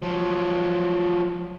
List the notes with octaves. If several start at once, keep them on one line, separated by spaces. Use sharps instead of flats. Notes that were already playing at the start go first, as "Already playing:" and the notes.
F3 F#3